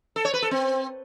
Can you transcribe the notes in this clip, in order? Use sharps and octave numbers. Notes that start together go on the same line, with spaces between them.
A4
C#5
B4
A4
C4